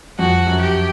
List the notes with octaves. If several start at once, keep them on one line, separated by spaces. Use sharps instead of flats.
F2 F#4
F#2
G4